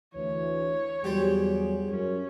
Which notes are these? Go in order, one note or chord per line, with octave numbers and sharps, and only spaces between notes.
D2 E3 C#5
E2 F#3 G3 G4 G#4 C5
F#2 C#4